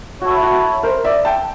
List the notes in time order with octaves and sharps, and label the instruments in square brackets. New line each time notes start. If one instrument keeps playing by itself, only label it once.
[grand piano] F#4 [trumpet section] C#5
[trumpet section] E4 A4
[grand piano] F#4
A#4 C5
D5 E5
G5 A5